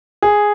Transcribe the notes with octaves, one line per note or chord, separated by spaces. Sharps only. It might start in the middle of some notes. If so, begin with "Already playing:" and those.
G#4